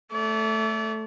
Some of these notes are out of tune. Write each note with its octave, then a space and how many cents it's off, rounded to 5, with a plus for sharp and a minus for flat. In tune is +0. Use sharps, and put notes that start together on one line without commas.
A3 +0 D5 -35